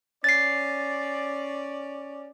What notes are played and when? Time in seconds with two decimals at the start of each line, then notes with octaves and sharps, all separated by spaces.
0.24 C#4 D5 A6 C7